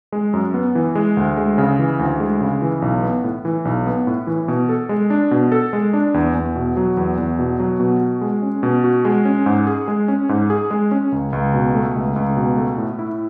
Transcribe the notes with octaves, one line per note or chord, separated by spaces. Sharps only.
G#3
F#2
B3
E3
G#3
D2
G#3
C#3
E3
D2
G#3
C#3
E3
B1
B3
A2
E3
B1
B3
A2
E3
B2
A4
G#3
D4
B2
A4
G#3
D4
E2
E2
B2
F#3
E2
E2
B2
F#3
B2
F#4
G#3
C#4
B2
F#4
G#3
C#4
G#2
G#4
G#3
C#4
G#2
G#4
G#3
C#4
C#2
C#2
B2
A3
C#2
C#2
B2
A3
A2
E4